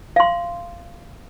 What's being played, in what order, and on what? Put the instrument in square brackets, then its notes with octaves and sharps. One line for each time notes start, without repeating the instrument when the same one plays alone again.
[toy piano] F5 C6